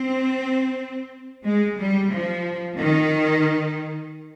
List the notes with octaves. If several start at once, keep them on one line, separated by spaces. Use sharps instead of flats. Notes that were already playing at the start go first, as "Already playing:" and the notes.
Already playing: C4
G#3
G3
F3
D#3